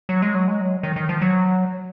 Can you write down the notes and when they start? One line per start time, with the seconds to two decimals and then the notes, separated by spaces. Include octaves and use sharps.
0.09 F#3
0.22 G#3
0.35 F#3
0.48 G#3
0.61 F#3
0.83 D#3
0.96 D#3
1.09 F3
1.21 F#3